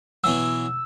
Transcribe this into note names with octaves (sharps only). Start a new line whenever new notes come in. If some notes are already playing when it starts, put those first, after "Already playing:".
B2 E3 F#3 E6